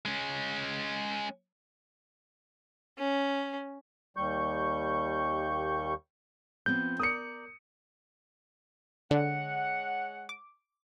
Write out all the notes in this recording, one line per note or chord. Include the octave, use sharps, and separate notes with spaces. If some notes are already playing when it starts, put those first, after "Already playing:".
G#3 C#4
C#4
D#2 G3 C#6 G6
F3 B3 C4 G6
A#4 D5 D#6 C#7
D3 G#3 C#5 F#5
D6